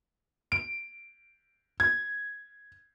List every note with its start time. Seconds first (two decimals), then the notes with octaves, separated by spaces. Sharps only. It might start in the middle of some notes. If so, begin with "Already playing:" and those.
0.52 D7
1.80 G#6